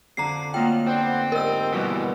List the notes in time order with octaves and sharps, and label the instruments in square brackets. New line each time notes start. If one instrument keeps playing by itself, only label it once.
[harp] F2 D3 [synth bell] A#5 C7
[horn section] F#3 F4 D#5 [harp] A3 A#3 A4 [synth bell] G5
[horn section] B3 D4 C5 [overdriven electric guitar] C4
[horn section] G#2 G3 D#4 [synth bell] A#4 E6
[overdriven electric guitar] G2 E3 [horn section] B2 [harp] F3 G3